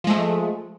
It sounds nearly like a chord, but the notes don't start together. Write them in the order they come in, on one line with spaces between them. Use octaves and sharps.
F3 G#3 A3